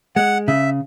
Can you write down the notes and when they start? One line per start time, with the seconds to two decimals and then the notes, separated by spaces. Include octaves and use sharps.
0.16 G#3 F#5
0.48 C#3 E5